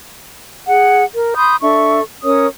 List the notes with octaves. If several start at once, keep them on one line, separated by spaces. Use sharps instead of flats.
G#4 F#5
A#4
B5 C6 D#6 G6
D4 A4 E5 C#6
C#4 A#4 C#5 D#6